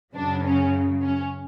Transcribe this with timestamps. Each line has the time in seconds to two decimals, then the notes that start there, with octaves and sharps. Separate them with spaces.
0.14 F#2 C#3 F#3 D4
0.43 C#4
1.01 C#4